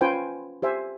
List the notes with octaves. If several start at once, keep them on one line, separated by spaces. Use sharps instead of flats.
C#4 F4 B4 C5 G5 G#5
G4 C5 E5 G#5